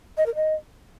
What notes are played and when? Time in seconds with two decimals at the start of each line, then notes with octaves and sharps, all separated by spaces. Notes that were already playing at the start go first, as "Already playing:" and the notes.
0.17 D#5
0.26 A#4
0.35 D#5